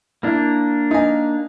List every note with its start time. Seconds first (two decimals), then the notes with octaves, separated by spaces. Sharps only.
0.23 A#3 D4 E4
0.91 D#4 G#5